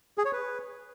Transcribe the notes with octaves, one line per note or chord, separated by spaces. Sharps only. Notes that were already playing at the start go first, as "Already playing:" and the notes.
G#4
C#5
B4